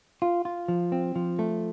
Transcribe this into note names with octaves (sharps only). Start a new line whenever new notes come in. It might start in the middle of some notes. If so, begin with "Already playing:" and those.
F4
F4
F3
C4
F3
A3